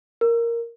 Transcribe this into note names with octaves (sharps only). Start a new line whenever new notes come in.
A#4